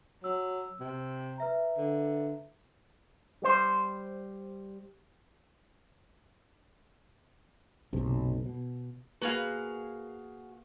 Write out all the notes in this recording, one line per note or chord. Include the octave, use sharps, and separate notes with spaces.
F#3 E6
C3
B4 E5 A#5
D3
G3 C5
F#1 B1 C3
B2
A#3 F#4 G#4 B4 F5